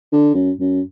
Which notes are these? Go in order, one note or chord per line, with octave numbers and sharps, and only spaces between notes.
D3
F#2
F#2